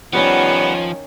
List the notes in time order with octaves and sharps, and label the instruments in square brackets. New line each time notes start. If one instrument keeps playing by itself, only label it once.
[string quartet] D#3 C#4 [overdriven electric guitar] F3 [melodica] G3 B3 F#5